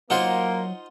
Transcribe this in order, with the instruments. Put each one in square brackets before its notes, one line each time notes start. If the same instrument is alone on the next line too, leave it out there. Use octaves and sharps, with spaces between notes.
[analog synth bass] F#3 [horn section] A#3 [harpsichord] D#4 F4 C5 [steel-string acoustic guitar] F#5